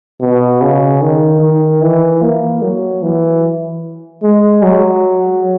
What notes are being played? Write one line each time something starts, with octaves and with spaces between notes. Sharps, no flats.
B2
C#3
D#3
D#3
E3
A#3
F#3
E3
G#3
F#3